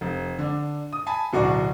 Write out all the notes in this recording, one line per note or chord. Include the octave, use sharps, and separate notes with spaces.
F1
D3 D4
D#6
G#5 A5 B5
D1 B2 F#4 D5 A#5 C#6